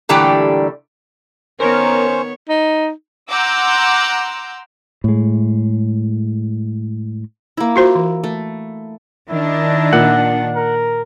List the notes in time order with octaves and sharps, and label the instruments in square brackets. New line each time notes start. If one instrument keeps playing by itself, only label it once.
[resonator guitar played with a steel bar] A#2 D3 E3 G3 A3 G4
[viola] D#3 [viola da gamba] B3 C#5 [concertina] C#4 C5 [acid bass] A#4
[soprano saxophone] D#4
[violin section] F#5 A#5 C6 D6 E6 G6
[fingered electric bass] A2 G#3
[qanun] A#3 E4
[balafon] F4 F#4 C5
E3
[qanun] A3
[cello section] D#3 D4 [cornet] E4
[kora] A#2 [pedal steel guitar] F#5
[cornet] A#4